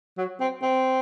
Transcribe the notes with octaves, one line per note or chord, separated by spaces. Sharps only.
F#3
C4
C4